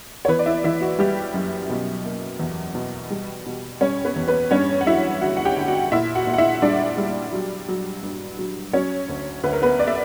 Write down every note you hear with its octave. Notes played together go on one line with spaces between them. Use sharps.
C#5
E3 B3 B4
D5
E4 E5
E3 E4 E5
F#4
G3 G4
F#2
B2
A#3
E2
B2
G3
B2
G3 C#4 C#5
B3 B4
E2
B3 B4
G2 C#4 C#5
F#5
F#3 E4 E5
D3 F#4 F#5
F#5
G4 G5
D3
F#4 F#5
A#2 E4 E5
F#4 F#5
A#2
F#5
E4 E5
G3 D4 D5
G3
F#3
F#3
G2
F#3
F#3 C#4 C#5
D2
D2 B4
A#4
B3 B4
D5
E5